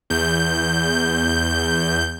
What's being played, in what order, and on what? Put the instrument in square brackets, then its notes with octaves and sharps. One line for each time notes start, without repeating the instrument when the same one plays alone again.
[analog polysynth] E2 G6